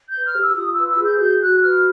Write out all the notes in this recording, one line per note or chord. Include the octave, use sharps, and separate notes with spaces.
G6
B4
F6
G4 E6
F4 D#6
E6
B4
E6
G#4
G6
F#4 G6
F#4 F#6
B4 F6